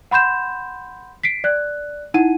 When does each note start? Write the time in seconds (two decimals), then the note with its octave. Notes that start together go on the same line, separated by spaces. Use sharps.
0.11 F#5 B5 C6 G6 E7
1.24 B6 C7 D7
1.44 D5 F#6
2.14 D#4 E4 F#5 D#7